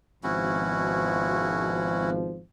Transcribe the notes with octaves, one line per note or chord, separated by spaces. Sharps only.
G#1 B2 F3 C#4 E4 F#4